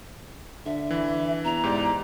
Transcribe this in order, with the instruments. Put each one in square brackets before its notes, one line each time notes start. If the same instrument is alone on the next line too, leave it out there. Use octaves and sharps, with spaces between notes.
[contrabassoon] D3 [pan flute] E5
[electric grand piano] E3
[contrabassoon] E2 [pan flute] A#5
[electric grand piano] G#2 G4 D5